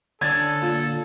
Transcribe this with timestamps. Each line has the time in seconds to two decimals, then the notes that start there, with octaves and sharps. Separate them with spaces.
0.21 D3 C#4 D4 A4 G#6 A6
0.62 A#2